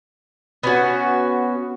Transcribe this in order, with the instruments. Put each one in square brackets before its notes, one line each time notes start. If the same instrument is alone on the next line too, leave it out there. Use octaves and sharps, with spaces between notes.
[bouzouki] B3 C#4 F#4